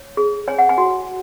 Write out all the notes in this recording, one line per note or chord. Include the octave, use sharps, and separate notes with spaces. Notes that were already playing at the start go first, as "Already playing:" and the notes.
Already playing: C#5
G#4
C#5 G#5
F#5
G#5
F#4